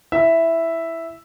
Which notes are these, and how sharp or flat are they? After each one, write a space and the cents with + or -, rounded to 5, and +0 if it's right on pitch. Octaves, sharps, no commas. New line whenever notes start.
E4 +0 E5 +0